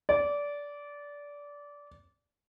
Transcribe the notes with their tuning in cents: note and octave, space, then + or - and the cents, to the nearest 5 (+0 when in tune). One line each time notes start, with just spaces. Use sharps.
D5 -20